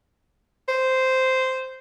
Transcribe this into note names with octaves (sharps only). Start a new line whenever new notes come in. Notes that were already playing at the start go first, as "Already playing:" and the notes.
C5